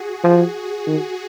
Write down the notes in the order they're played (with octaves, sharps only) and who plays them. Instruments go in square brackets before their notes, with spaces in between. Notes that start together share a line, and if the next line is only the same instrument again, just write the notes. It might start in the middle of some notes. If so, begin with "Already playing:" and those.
Already playing: [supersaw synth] F#4 G#4
[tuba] F3
D#3